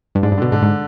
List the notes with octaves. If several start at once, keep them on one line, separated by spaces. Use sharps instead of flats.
G2
G#2 D4
G2
B2 D3
G#2 D3
G#2